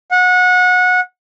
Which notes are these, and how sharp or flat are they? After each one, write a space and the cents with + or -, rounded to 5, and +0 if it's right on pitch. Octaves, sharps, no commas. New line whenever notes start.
F#5 -25